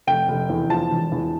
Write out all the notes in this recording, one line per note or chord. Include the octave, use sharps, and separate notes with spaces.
F1 G5
F1
E2
F3 A5
E1
E2